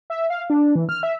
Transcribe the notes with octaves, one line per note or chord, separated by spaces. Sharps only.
E5
F5
D4
E3
F6
E5